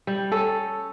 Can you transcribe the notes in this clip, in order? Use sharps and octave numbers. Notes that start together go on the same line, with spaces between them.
G3
C#4 A4